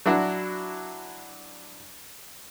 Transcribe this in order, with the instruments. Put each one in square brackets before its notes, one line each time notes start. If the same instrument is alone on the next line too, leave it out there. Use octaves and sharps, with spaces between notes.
[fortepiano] F#3 D4 E4 F#4